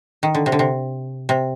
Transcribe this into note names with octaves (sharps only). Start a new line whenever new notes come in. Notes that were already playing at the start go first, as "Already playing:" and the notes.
D#3
D3
C3
D3
C3
C3